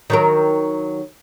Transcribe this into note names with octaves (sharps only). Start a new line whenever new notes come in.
D#3 F#3 A#4